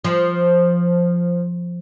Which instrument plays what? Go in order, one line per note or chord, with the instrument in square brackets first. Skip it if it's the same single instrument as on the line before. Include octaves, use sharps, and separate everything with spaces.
[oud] F3